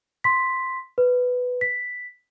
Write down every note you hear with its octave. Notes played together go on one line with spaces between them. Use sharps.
C6 B6
B4
B6